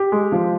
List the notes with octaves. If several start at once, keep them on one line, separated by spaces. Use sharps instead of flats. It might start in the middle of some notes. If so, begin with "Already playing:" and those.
Already playing: G4
G#3
F3